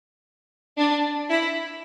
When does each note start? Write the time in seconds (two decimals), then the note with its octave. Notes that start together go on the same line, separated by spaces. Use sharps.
0.78 D4
1.29 E4